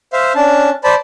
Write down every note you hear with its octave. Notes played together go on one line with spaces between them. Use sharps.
C5 E5 F5
C#4 D4 A5
C5 D5 A5 B5